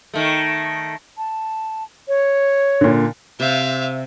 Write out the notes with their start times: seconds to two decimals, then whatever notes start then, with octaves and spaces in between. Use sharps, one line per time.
0.14 D#3 A3
1.18 A5
2.08 C#5
2.81 A#2 D3
3.40 C3 E5 F5